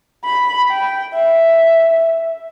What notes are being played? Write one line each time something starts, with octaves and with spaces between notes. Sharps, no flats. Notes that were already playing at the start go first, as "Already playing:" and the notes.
B5
G5
E5